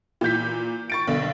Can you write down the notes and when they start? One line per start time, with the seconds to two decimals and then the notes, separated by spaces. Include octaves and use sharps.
0.21 A#2 E3 G6 B6
0.90 C#6 A6 D7
1.07 B1 D3